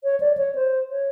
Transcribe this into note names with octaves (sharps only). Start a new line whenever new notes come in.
C#5
D5
C#5
C5
C#5